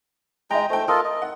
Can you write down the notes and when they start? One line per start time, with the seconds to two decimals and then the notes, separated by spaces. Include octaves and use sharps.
0.51 G#3 D#5 G5 A#5
0.70 A3 C5 G5
0.88 F4 A4 A#4 D#5
1.05 D#5
1.22 F#5